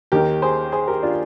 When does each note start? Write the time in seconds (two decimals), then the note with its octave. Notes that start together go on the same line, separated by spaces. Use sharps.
0.12 D#2 D#3 G4 A#4
0.42 G#4 C5
0.72 G#4 C5
0.88 G4 A#4
1.03 D4 F4